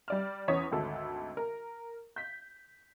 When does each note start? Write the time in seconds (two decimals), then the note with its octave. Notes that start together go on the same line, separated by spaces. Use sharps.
0.08 G3 D5 F6
0.48 E2 C#4 C#5 D#6 B6
0.71 G#1 D2 A4
1.37 A#4
2.16 G6 B6